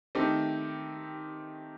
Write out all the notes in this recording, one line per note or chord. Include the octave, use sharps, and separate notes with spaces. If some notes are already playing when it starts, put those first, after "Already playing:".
D#3 A3 C4 D#4 G4